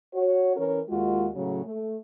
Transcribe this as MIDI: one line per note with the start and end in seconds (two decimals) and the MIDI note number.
0.14 0.53 66
0.14 0.53 73
0.57 0.79 52
0.57 0.79 61
0.57 0.79 70
0.57 0.79 73
0.89 1.28 39
0.89 1.28 56
0.89 1.28 65
0.89 1.28 66
1.35 1.64 45
1.35 1.64 49
1.35 1.64 54
1.65 1.96 57